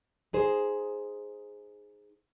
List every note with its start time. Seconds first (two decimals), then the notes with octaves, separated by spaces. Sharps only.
0.33 D#4 G#4 C5